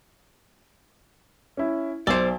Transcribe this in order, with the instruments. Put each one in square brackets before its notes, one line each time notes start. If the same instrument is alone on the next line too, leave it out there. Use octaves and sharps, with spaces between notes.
[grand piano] C#4 E4
[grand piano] B1 E6 G7 [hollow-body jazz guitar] C5 D5